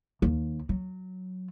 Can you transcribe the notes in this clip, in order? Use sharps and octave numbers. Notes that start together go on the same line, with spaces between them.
D#2
F#3